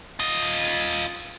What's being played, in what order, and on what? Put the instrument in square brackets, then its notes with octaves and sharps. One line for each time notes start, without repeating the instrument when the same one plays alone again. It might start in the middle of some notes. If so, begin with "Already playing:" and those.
[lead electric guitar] F4 D#5